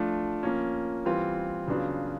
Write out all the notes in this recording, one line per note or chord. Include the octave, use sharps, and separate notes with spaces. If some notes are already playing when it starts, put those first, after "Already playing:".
Already playing: F3 A3 D4 F4
F3 A#3 C#4
E3 G3 C4 F4
C#3 F#3 B3 D4 F4